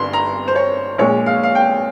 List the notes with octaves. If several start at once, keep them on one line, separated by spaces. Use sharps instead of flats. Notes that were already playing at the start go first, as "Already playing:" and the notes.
Already playing: G1 G2 C6
A#5
C5
C#5
A#1 A#2 G#3 C#5
F5
F5
G5